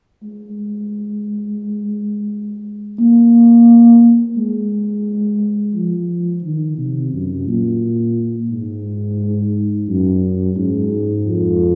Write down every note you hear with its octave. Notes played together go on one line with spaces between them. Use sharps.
G#3
A#3
G#3
F3
D#3
C3
F#2
A#2
G#2
F#2
G#2
F2